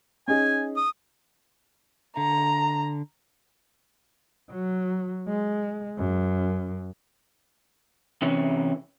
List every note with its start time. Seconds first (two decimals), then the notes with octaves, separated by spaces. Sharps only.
0.28 C#4 D#4 G#4 G#5
0.76 D#6
2.17 D3 A#5
4.50 F#3
5.28 G#3
5.98 F#2
8.22 C3 E3 C#4